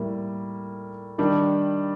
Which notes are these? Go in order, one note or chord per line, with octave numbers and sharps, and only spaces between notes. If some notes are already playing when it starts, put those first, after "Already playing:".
Already playing: A2 G3 A#3
D#3 G3 D4